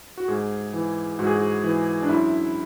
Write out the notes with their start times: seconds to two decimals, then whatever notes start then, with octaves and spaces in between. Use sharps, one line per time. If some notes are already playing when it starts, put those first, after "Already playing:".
0.18 F#4
0.28 G#2 G#4
0.73 E3
1.19 G#2 F#4
1.27 G#4
1.35 F#4
1.64 E3
2.02 D4
2.09 F#2 E4